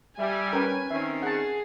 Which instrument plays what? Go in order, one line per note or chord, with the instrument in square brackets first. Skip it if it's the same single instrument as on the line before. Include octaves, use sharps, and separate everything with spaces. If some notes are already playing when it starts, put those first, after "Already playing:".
[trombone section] G3 [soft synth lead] E5 [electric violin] G#5
[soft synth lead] C#4 [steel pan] A#4 B4 G5
[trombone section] D#3 C4 C#4 [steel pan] E5 [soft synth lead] C7
[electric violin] G#4 [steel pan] F#5 A5